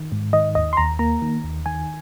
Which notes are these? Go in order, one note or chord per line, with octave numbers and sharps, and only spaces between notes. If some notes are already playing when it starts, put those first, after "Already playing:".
Already playing: D#3
G#2
D#3 D#5
D#2 D#5
C6
D#2 A#5
A#3 A#5
D#3
D#2
D#3 G#5